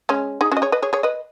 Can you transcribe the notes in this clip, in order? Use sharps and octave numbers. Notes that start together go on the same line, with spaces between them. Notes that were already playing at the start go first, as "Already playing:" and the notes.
G#3 C#4
D#4 G#4
C#4 F#4
D#5
G#4 C#5
B4 D#5
G#4 C#5
G#4 C#5
B4 D#5